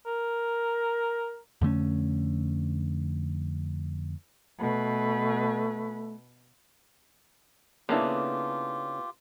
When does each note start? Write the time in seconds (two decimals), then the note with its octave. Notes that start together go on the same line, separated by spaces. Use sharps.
0.07 A#4
1.61 F2 D3 A3 C#4
4.59 B2 A3 B4
7.89 C#3 A#3 B3 D4 E4 F4 G4 A4